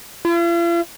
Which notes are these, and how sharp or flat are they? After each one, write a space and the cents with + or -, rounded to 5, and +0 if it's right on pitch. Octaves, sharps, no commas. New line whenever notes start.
F4 -45